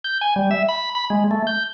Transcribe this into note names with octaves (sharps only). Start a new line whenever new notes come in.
G6
G#5
G3
E5
B5
B5
G#3
A3
G6